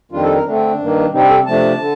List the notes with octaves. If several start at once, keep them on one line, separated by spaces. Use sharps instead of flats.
F2 D#3 G3 D4 F4
A4
A#4
D3 A3 C4 D4
G2 D#3 A#3
C3 G3 C4 D#4
D4
A4
C3 F3 A3 D4 A5
D3